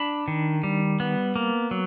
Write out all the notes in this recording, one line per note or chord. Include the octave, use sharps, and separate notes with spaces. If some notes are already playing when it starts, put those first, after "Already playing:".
Already playing: D4 B5
D#3
G3
B3
A#3
F#3